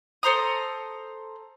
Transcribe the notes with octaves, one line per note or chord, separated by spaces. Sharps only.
A4 C5 A#5 D#6